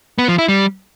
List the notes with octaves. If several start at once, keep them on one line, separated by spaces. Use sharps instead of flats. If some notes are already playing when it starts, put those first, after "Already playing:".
B3
F3
E4
G3